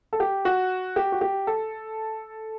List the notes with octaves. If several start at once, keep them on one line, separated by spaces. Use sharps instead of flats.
A4
G4
F#4
G4
F#4
G4
A4